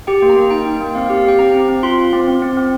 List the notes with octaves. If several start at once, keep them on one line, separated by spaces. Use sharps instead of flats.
G4 G5
A#3
A#5
A#3
D#4 G5
D#4
A#3
C4 F5
F5
G4
F5
G4 G5
C4 A#5
C4
C4
F4 C6
F4
C4
C4
C4
C4